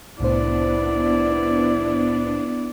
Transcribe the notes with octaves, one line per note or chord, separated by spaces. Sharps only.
C2 A2 B3 D4 E4 C5 D5